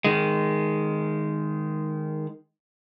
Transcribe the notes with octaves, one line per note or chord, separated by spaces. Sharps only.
D#3 G#3